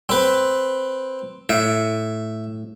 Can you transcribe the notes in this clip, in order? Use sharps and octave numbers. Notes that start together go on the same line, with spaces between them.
C4 B4
A2 E5